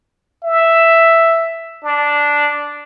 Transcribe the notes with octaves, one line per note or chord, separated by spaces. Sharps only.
E5
D4